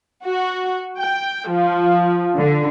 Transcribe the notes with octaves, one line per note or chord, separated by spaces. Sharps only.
F#4
G5
F3
D3